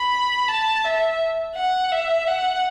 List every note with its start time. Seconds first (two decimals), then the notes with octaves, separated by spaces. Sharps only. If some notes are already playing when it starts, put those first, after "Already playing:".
Already playing: B5
0.48 A5
0.84 E5
1.55 F#5
1.92 E5
2.27 F#5